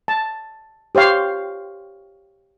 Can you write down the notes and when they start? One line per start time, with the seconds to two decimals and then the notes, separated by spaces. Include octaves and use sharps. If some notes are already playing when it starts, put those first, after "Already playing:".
0.08 A5
0.95 G4 C5 C#5 F5 C6